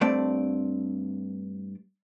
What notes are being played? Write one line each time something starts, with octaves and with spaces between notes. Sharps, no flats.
G2 A3 C4 D5